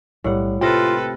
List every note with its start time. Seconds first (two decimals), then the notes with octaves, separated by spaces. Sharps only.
0.24 B1 A2 G3 A#3 F#5
0.61 C3 F4 A4 B4 F5 G5 A#6